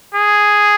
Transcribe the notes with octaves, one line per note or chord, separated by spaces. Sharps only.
G#4